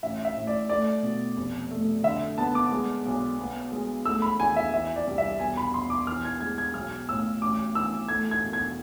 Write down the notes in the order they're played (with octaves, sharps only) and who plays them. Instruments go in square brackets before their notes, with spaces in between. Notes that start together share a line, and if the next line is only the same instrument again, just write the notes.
[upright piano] A1 E5
E5
A2
D5
A3 D5
B2
F1
A3
D3 E5
B3 A5
D6
G#3
B1
B3
G#3
A3 E6
B5
E2 G#5
E5
E3 E5
D5
C2
E5
E1 G#5
B5
E1 C6
D6
E3 F6
G#6
G#3 G#6
G#6
B1 F6
A2 E6
A1 D6
E3 E6
A3 G#6
G#6
E1
G#6